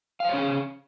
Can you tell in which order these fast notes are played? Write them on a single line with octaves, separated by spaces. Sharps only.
F5 C5 C#5 C#4 G#4